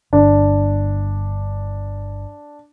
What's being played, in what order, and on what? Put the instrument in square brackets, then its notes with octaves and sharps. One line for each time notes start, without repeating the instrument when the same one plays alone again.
[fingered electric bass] G1 [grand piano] D4